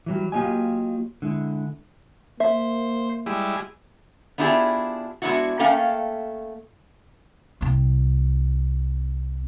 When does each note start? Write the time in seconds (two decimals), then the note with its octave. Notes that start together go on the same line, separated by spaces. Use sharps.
0.06 E3 F#3 G3
0.32 F#3 A#3 F4 G4 D#5 G#5
1.22 D3 G#3 E4
2.40 A#3 C5 E5
3.26 G3 G#3 E4
4.38 B3 D4 E4 F4 G4 G#4
5.22 G#3 B3 D4 E4 F#4
5.59 A3 A#3 C#4 F5 G5
7.61 C2 C4